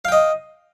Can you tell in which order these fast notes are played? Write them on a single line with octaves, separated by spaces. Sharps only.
F5 G5 D#5